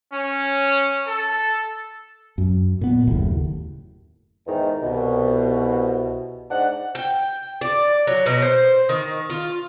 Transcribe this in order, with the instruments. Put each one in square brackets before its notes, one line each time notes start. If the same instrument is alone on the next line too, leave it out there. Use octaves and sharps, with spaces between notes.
[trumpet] C#4
A4
[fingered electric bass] F#2
A#2 B3
F#1 D#2 A2
[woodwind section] E2 G#2 D#3
C2 B2
G#2 D4 F#5
[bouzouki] G5
D5
F#3
B2
C5
D#3
F4